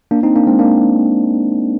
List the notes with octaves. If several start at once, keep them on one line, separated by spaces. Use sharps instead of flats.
A#3 D4
C4 D#4
A#3 D4
G#3 C4
A#3 D4